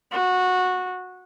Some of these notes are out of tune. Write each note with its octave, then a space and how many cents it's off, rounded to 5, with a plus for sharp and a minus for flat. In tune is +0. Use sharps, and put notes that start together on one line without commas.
F#4 -15